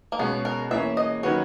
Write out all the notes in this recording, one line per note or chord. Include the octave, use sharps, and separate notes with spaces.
A#3
B2 G#3 B3 C#4 G#4
A#4
E3 A#3 C#4 E5
D#5
D#3 F#3 C#4 F#4 B4 C#5